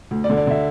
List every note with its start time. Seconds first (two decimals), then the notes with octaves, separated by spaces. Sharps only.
0.11 D2
0.24 D5
0.30 D3
0.37 D5
0.47 D3 E5